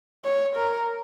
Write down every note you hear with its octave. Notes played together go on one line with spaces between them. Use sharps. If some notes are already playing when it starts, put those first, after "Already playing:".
C#5
A#4